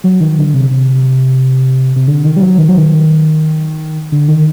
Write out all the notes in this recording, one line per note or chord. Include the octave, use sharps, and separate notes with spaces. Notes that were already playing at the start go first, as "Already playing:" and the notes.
F#3
D#3
D3
C3
C3
C3
D3
D#3
G3
F#3
D#3
F#3
D#3
D3
D#3